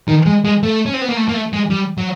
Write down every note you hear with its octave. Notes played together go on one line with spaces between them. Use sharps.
D#3
G#3
G#3
A3
C#4
C4
B3
A#3
A3
A#3
A3
G#3
G3
F#3